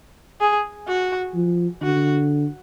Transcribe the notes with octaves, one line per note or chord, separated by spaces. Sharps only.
G#4
F#4
F3
D3 F#4